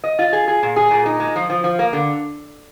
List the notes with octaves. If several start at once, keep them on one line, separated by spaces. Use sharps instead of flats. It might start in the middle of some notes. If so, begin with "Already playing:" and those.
D#5
F4
G#4
G#4
A#2
G#4
A#2
D#4
G#3
F3
F3
F3
A#3
D3